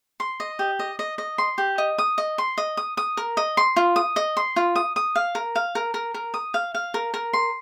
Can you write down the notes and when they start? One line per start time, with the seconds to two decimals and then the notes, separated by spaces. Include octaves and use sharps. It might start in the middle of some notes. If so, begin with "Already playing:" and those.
0.20 C6
0.40 D#5
0.59 G4
0.79 D#5
0.99 D#5
1.18 D#5
1.38 C6
1.58 G4
1.78 D#5
1.98 D#6
2.18 D#5
2.38 C6
2.58 D#5
2.77 D#6
2.97 D#6
3.17 A#4
3.37 D#5
3.57 C6
3.76 F4
3.96 D#6
4.16 D#5
4.37 C6
4.56 F4
4.76 D#6
4.96 D#6
5.16 F5
5.35 A#4
5.56 F5
5.75 A#4
5.94 A#4
6.14 A#4
6.34 D#6
6.54 F5
6.75 F5
6.94 A#4
7.14 A#4
7.33 C6